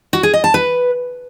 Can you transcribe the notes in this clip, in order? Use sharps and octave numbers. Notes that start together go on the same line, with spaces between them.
F#4
G#4
D#5
A5
B4